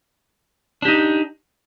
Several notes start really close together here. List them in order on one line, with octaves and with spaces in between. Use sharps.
D4 G4 D#4